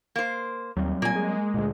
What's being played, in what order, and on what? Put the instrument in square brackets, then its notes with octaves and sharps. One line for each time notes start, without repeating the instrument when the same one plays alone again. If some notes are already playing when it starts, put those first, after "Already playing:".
[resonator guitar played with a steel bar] A#3 C5
[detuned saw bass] D#2 [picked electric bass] F#3 G3 C4
[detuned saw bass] A#2 [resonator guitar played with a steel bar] A#3 G#5
[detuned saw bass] G#3
[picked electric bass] D2 A#2